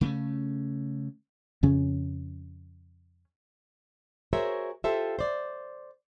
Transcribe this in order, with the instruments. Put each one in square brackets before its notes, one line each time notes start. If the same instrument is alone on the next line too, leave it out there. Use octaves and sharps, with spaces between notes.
[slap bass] C#3 A3 B3 C#4
[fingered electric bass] F2 C#3 C#4
[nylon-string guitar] F#4 G#4 A#4 C5 C#5 E5
F4 G4 A4 C5 E5
C5 D5